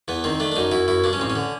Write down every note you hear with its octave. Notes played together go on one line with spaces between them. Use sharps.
E2 B3
D#3 C4
A3 D4
D4
F#2 D#4
F#2 E4
F#2 E4
G2 D4
C#4
A1 C4
C#4
D3